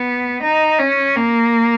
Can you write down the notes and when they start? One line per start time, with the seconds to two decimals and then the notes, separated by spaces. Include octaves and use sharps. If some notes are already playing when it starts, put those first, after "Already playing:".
Already playing: B3
0.42 D#4
0.79 C#4
1.16 A#3